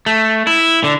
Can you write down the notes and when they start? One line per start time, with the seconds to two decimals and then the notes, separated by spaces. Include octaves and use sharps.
0.06 A3
0.47 E4
0.84 D3